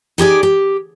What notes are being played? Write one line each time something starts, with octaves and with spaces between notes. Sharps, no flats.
D#4 G4 G#4 D5
G4